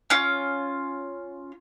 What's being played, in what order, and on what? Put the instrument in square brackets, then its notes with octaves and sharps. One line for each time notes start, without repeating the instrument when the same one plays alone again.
[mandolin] C#4 F4